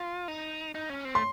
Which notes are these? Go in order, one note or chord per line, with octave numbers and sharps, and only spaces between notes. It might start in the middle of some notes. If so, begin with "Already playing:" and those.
Already playing: F4
D#4
D#4
C#4
C4
A3 C6